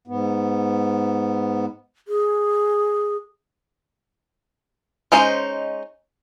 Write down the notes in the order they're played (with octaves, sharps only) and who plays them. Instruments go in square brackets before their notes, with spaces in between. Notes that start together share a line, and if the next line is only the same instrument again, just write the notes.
[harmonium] G#2 B3
[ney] G#4
[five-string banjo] G#3 C#4 D#4 C5